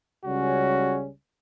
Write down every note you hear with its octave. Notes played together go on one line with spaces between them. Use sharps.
C#2 C#3 G3 C#4 F#4